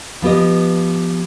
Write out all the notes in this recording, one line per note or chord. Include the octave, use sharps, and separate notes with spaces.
F3 B3 G4 D#5